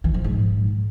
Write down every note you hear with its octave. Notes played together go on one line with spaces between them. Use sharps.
E3
F3
G#2